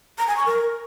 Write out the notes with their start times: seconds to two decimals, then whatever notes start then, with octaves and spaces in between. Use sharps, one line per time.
0.18 A#5
0.28 G#5
0.37 C#6
0.46 A#4